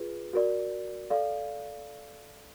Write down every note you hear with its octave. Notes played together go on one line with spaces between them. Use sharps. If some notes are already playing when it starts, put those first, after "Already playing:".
Already playing: F4 G#4 B4
F#4 A#4 D5
A4 D5 F5